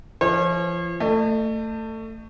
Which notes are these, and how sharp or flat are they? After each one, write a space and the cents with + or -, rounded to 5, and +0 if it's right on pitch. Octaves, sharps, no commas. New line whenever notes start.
F3 -35 C#5 -45
A3 +25 D#5 -40